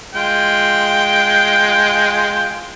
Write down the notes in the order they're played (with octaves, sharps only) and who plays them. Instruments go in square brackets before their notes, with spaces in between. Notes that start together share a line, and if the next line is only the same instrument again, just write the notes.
[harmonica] G#3 F4 G5